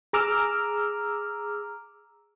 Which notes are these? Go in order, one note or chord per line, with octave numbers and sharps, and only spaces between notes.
G#4 A#5 D6 E6 F6